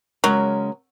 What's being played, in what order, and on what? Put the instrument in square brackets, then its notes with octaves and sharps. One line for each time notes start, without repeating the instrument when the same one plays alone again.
[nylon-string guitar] C#3 G#3 A#4 [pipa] F#3